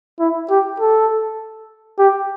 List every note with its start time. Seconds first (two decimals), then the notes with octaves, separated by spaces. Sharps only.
0.20 E4
0.50 G4
0.80 A4
1.99 G4